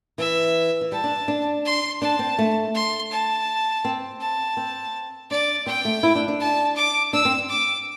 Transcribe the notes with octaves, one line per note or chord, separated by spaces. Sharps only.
E3 E5
E3
G3 A5
D4
D4
C6
D4 A5
C4
A3
C6
A5
C4
A5
C4
D4 D5
C4 G5
A3
E4
D4
D4
A5
D6
D4 E6
C4
D6